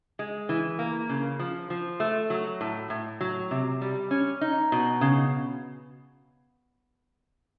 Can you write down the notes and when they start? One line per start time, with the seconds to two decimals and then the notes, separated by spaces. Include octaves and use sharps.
0.19 G#3
0.49 E3
0.79 A#3
1.09 C#3
1.40 F3
1.70 F3
2.00 A3
2.30 F#3
2.61 A2
2.90 A2
3.21 F#3
3.51 C3
3.81 G3
4.11 C#4
4.41 D#4
4.72 B2
5.01 C#3